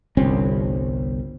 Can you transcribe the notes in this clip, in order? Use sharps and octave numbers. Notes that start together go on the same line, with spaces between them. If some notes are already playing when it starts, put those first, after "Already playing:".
G1 C2 C4 C#4